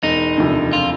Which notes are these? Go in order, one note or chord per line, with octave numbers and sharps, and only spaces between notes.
E1 D#4
D2 C3 F3
F4